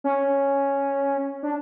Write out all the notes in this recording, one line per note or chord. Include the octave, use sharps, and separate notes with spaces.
C#4
D4